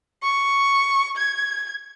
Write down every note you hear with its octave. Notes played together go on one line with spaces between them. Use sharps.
C#6
G#6